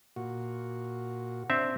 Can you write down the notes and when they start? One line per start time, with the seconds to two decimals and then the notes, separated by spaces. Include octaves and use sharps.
0.16 A#2 F#4
1.50 C4 D4 E5